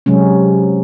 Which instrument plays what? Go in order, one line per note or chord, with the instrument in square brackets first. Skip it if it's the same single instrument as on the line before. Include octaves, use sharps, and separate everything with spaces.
[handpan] C3 F#3 G#3 C#4